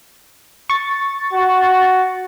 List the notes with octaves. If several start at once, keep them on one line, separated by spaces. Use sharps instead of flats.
C#6 A6
F#4